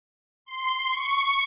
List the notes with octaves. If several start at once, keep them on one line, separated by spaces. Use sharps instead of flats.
C6
C#6